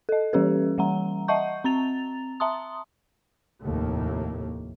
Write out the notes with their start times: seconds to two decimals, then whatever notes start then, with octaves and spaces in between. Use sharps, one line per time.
0.09 A4 D#5
0.33 E3 G3 C#4 G4 A4 B4
0.78 E3 G3 F#5 A#5
1.28 D#5 E5 F#5 A5 C#6 G6
1.64 C4 A#5 A6 F7
2.40 E5 A5 A#5 C6 D#6
3.62 F1 D#2 A2 A3 A#3